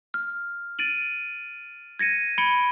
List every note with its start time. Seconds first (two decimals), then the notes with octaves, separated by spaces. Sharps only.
0.14 F6
0.79 A6 D7 D#7 F#7
1.99 G#6 A#6 C#7 D#7
2.38 B5 G#6 C#7 D7 G7